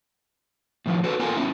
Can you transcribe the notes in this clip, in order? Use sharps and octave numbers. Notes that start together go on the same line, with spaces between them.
A2 D#3 F3 F#3
F#4 A4 B4 C5
B3 F4 A4 A#4 G#5 A#5
B3 C#4 E4